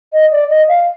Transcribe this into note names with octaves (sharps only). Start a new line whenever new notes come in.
D#5
D5
D#5
F5